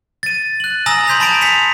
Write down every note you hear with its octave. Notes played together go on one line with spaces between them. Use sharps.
A6 D#7
F#6 F#7
G#5 A#5 D#6 E6 A#6 F#7
G#5 C6 G6 B6 F7 F#7
A5 B5 C6 A6 D7 F7
G#5 B6 C#7 F7